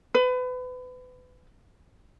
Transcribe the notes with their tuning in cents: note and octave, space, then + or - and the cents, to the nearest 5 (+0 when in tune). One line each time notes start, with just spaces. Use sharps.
B4 +30